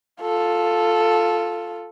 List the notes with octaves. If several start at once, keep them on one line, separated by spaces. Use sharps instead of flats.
F4 A4